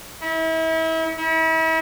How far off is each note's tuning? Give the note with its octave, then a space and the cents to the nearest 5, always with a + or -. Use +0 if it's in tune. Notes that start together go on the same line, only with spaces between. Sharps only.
E4 -35
E4 -40